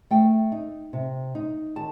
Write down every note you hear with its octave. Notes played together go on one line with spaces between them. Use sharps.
A3 G5
D#4
C3
D#4
D#3 A5